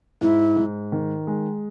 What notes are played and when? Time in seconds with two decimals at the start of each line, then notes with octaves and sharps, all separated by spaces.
0.21 G#2 E4
0.56 G#2
0.92 D#3
1.27 G#3